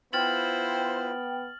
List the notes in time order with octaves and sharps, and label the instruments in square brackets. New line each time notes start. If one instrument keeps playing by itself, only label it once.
[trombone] B3 [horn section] E4 F4 C5 [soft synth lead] G5 [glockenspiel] F6 A6 F#7